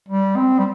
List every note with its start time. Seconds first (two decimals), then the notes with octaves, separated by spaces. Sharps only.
0.09 G3
0.36 C4
0.59 G3